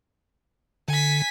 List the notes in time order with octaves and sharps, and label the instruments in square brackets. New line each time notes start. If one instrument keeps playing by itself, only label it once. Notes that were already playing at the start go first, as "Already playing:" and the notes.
[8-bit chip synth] D3 [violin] G#5 B6